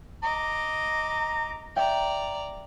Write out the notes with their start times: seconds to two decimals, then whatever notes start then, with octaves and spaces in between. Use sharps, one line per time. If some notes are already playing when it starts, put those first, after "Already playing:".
0.23 D#5 A#5 D6
1.76 D5 E5 G5 A#5